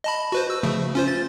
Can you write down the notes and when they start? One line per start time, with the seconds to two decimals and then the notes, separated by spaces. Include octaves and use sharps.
0.04 D#5 A5 B5
0.32 F#4 B4 C5
0.50 E6
0.63 C#3 F3 A3
0.95 C#4 F4 C5
1.08 A6